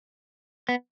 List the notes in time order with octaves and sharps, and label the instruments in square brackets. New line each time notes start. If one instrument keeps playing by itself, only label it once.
[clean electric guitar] B3